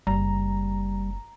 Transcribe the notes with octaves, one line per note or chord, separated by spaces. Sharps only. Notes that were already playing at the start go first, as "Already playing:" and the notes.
F#1 G3 A#5